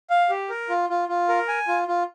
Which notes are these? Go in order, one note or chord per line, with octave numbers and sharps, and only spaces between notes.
F5
G4
A#4
F4
F4
F4
A#4
G#5
F4
F4